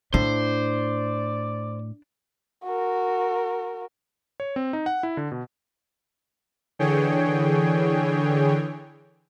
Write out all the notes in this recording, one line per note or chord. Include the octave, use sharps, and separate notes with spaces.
A2 D4 C5 D5
F#4 A#4
C#5
C4
D#4
F#5
E4
D3
B2
D3 E3 G#4 C#5 G5